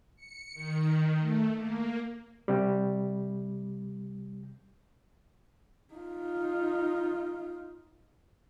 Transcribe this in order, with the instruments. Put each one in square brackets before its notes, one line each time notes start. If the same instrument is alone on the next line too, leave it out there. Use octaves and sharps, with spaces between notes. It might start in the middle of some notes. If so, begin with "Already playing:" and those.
[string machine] C#7
D#3
A3
A#3
[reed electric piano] C3 G3
[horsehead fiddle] D#4 F4